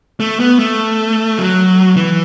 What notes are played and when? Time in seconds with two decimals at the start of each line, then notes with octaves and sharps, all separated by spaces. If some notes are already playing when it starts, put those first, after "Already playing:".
0.20 A3
0.40 B3
0.59 A3
1.38 F#3
1.96 E3